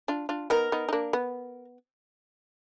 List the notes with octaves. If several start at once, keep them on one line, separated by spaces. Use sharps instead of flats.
D4 F4
D4 F4
B3 D#4 A#4
B3 D#4
D#4
A#3 D4
B3